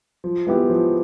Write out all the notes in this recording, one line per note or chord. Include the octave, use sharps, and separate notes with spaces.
F3
G#3 B3 E4 G4
F3